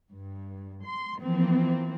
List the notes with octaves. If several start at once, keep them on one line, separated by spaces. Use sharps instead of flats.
G2
C6
E3 F3 A#3 C4